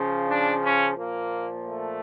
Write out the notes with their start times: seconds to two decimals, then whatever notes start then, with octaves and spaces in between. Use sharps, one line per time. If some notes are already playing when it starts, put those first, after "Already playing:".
Already playing: C#3 F3
0.27 D4
0.62 C#4
0.97 A#2 F3 A#3
1.65 A3